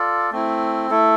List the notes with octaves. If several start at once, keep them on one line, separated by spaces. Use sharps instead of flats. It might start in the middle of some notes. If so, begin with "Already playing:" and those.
Already playing: F4 A4 D5
A3 C4 E4
A3 E4 A4